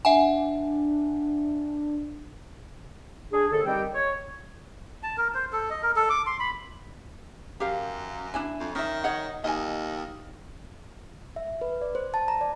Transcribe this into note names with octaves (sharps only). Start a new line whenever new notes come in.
D4 E5 F#5 G#5
D4 G#4
D#2 D3 A4
D#3 G3 C4 G4 G5
C#5
A5
A#4
C5
A4
D#5
A#4
A4
D6
C6
B5
F#2 G4 A#4 F5
D4 E4 G#5
F2
D#3 C#4 E5
C#5 D#5 F#5
D#2 D#5 G#5
E5
B4
D5
C5
A5
A#5
D5